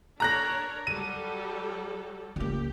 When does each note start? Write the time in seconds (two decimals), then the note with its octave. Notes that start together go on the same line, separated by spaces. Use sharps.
0.20 D4 A#4 C#5 A#5 F#6 A#6
0.87 F#3 G3 A4 D#7
2.36 C#2 A#3 G4